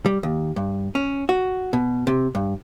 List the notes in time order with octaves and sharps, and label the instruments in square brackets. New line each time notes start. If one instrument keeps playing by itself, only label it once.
[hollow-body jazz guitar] G3
D#2
G2
C#4
F#4
B2
C3
G2